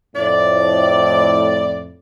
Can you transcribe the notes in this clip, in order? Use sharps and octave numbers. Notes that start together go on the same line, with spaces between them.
F2 A2 D5